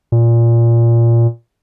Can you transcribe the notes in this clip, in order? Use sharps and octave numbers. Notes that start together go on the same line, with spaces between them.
A#2